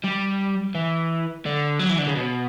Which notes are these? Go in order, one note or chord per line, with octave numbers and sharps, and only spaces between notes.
G3
E3
D3
F#3
E3
D3
C#3
B2